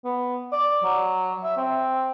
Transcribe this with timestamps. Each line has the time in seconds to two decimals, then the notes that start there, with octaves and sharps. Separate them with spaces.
0.04 B3
0.52 D5
0.84 F#3
1.44 E5
1.57 C4